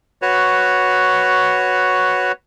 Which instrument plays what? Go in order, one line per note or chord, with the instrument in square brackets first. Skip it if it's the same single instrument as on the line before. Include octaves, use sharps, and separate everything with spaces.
[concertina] F#4 B4 C#5